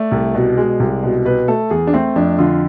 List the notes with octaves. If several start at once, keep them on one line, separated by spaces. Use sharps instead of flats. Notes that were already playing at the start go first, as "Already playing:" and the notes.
Already playing: A3 D5
C2
B2
G#3
C2
B2
B2 B4
A3 A4
E2 G#4
D4
A3 C4
F2 D4
D3 F4